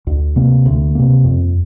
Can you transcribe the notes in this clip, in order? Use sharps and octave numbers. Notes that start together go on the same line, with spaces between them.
D2
C3 A#3
D2
C3 A#3
F2